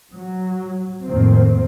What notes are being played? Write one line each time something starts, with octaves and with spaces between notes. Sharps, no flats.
F#3
F2 A2 D#3 A#3 C4